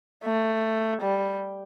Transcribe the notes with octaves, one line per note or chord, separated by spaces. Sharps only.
A3
G3